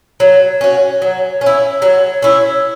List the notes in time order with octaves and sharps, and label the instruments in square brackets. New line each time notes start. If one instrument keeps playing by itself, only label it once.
[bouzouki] F#3
C#4 F#4
F#3
C#4
E4
F#3
C#4 E4